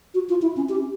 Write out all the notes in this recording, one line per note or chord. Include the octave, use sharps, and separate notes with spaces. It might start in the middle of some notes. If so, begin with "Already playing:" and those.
F#4
F4
E4
C#4
G4